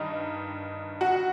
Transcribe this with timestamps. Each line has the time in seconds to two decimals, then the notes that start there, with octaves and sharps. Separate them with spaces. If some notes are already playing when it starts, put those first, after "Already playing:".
Already playing: G2 D#3 D#4
1.01 F#4